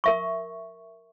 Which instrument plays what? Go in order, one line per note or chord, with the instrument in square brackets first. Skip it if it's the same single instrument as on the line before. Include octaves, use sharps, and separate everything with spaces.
[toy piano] A#4 E5 C#6